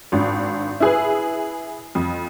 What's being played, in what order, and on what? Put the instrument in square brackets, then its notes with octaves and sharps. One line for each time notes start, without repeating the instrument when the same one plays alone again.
[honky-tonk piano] G#1 D4
E4 G#4 B4
F2